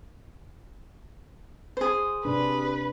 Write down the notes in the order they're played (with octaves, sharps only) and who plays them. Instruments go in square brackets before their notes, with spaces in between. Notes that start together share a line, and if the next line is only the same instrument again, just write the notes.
[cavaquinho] G#4 C5
[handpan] C3 D4 [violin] B4